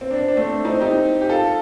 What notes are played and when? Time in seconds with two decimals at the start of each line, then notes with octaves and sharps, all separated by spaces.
0.01 C4
0.11 D4
0.20 C4
0.28 D4
0.37 A3 C4
0.65 C4 D#4
0.81 D#4 G4
1.21 G4
1.29 F4 A4